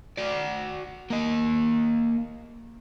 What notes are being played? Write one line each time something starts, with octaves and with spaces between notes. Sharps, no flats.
F#4 D5
A#3 D#5